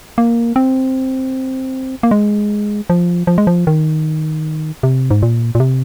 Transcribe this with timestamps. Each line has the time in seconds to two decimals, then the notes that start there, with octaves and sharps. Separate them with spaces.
0.18 A#3
0.56 C4
2.03 A#3
2.11 G#3
2.90 F3
3.27 F3
3.38 G#3
3.47 F3
3.67 D#3
4.83 C3
5.11 G#2
5.22 A#2
5.55 A#2
5.60 C3